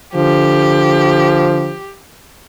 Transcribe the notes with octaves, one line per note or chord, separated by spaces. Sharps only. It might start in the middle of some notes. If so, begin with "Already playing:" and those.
D3 F3 G4